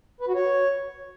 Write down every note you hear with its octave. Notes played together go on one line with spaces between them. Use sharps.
B4
F#4
C#5